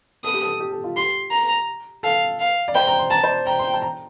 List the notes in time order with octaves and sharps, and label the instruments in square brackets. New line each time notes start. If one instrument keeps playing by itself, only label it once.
[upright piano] A4 [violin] D#6
[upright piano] G4
A4
G4
A4
F4
[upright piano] G4 [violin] C6
[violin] A#5
[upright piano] A4 [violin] F5
[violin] F5
[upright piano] D5
[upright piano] C5 [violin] G5
[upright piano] A#5
C6
[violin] A5 [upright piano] A#5
[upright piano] C5
D5
[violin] G5 [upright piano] A#5
[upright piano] C6
A5
A#5